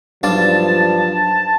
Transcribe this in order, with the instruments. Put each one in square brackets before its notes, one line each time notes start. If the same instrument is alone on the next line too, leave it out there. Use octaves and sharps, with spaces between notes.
[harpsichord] B1 F4 D5 [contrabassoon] G2 [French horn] F3 [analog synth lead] A5